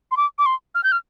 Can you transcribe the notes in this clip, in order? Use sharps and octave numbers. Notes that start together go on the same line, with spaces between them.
C6
D6
D6
C6
F6
G6
F6